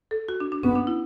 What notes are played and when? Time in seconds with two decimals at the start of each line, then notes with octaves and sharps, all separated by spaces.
0.11 A4
0.29 F#4
0.40 D4
0.52 D4
0.63 B3 C#4
0.76 D4
0.87 E4